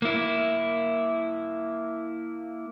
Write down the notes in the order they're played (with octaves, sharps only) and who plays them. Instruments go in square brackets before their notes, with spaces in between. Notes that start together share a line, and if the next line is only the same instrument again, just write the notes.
[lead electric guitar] A#3 E4